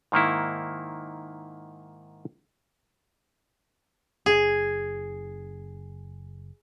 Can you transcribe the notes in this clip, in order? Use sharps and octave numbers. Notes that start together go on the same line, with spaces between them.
G#2 D#3 A#3 E4
F#1 G#4